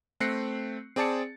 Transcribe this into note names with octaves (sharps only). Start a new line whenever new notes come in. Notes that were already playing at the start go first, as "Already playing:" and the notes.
A3 C4 F#6 A#6 C7 C#7
C4 G#4 D5 A5 A6 C#7